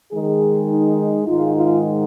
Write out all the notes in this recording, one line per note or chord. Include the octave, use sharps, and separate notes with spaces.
D#3 G#3 D#4 G#4
D#4
G#2 D#3 G#3 D#4 F4
F4